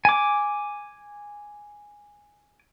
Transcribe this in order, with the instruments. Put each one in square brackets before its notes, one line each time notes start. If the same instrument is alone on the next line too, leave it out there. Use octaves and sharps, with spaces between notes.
[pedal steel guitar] G#5 D6